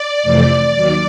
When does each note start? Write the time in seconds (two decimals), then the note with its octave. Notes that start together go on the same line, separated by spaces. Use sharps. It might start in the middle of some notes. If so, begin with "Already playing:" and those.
Already playing: D5
0.23 F2 C3 E3 A3 C4
0.73 D#2 D#3 F#3